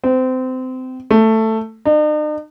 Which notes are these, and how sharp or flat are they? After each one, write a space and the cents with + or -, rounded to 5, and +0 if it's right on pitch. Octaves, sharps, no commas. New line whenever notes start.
C4 -25
A3 +10
D#4 -45